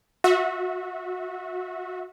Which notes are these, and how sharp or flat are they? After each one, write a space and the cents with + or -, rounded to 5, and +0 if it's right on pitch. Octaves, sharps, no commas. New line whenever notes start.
F#4 -25 E5 -15